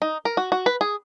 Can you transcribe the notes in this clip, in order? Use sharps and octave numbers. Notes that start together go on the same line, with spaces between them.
D#4
A#4
F#4
F#4
B4
G#4